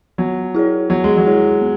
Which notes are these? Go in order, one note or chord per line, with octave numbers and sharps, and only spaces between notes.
F#3 B3
E4 G#4 C#5
F#3 B3
G#3
F#3
E4 G#4 C#5
B3